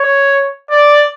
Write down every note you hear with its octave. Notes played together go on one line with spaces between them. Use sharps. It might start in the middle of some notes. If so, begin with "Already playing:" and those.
Already playing: C#5
D5